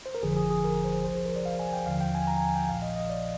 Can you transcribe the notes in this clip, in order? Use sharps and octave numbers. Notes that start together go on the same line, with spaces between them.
C5
A#4
G1 F2 D3 F3 G#4
G#4
G#4
A#4
C5
C2 C3 F3 C5
G#4
A#4
D5
F5
G#5
G5
D#2 D3 F3 F5
G5
G#5
A#5
G#5
G5
A#1 A#2 F3 F5
D#5
D#5
D5